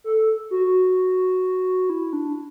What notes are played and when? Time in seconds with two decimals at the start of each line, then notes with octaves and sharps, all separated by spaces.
0.04 A4
0.51 F#4
1.90 E4
2.13 D4